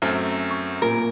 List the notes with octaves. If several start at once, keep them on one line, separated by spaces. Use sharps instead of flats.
F#2 A3 C4 F6
C#6
A#2 A#3 A#4